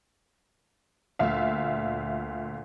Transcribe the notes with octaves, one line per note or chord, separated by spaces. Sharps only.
D2 A#2 E5 F5